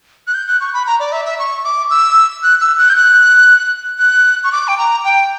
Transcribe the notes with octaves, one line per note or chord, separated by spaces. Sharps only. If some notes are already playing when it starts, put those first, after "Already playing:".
F#6
G6
F#6
C#6
B5
A#5
D5
E5
E5
C#6
D6
E6
F#6
E6
F#6
G6
F#6
F#6
C#6
D6
G5
A#5
G5